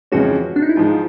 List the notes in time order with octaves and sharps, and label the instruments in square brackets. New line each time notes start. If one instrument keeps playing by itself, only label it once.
[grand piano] F2 C#3 E3 G#3 C#4 [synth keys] F#4
[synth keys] D4
D#4
E4
[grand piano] G#2 F3 G#3 [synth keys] F4